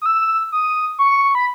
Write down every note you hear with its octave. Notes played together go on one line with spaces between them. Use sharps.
D#6
E6
D#6
C#6
B5